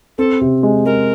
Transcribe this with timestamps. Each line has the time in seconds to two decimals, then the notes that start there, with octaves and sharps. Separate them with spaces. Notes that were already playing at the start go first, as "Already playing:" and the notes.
0.18 C4 A4
0.41 C3
0.63 G#3
0.85 G#3 A#4